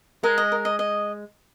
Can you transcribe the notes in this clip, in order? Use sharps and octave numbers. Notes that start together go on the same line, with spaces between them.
G#3 A#4
D#5
A#4
D#5
D#5